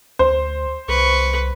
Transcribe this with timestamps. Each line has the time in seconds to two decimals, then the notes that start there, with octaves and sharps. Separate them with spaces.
0.19 D2 C5
0.88 C2 B4 C#6